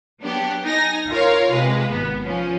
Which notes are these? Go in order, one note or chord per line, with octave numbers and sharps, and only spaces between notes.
F#3 B3 D4 G4
D#4 G#5 A#6
F4 A#4 C#5 F5
C3 G#3 B4
G#1 B3
F3 C#4